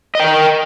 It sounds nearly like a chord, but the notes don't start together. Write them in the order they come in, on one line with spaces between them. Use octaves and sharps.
D#5 G5 A#4